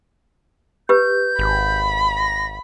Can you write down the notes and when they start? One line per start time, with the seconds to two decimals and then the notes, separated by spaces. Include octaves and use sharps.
0.89 G4 B4 G6
1.39 G#1 B5
2.17 A#6